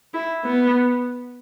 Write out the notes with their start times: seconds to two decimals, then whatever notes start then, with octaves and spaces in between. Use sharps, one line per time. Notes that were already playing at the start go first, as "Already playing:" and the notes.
0.14 E4
0.44 B3